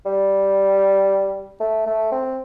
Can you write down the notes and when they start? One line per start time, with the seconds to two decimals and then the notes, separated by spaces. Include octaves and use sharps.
0.06 G3
1.60 A3
1.86 A3
2.12 C4